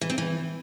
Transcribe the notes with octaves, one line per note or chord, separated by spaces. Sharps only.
E3
C4
E3